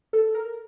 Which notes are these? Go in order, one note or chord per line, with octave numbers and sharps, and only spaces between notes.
A4
A#4